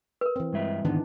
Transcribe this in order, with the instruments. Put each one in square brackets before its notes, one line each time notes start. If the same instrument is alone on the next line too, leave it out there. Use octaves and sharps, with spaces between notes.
[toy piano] A#4 B4
[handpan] E3 C4
[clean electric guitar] G2 G#3 E5
[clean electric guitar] D2 G#2 B3 [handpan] D#3 E3 D4